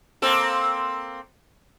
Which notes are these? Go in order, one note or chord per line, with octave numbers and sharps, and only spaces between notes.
A#3 C4 A4